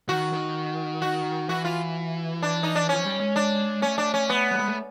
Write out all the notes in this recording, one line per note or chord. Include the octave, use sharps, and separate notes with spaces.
D#3 F#4
D#3
F#4
E3 F#4
F4
D4
D#4
D4
F3 C#4
G3
G#3
D4
A3 C#4
D4
C#4
B3
G3
G#3
A3